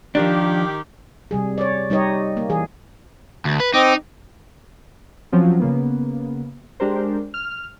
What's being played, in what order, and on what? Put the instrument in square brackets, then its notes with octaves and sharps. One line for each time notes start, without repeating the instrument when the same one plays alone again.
[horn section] D#3 G4 [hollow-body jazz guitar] F3 D4
[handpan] C3 G3 G#4
C#5 D5
G3 D#4 G4 C#5 D#5
A#3
E3 G#4
[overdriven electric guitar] D2
B4
[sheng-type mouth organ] C4 D#5 D6 [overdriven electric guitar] D#4
[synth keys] F3 F#3 C4 C#4 F4
C#3 A#3 B3
G#3 D4 G4 A#4 C5
F6